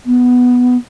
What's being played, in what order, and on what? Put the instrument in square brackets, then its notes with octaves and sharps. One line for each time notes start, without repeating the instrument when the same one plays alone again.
[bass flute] B3